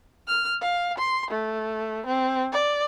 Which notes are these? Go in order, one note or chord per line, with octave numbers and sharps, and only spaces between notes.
F6
F5
C6
A3
C4
D5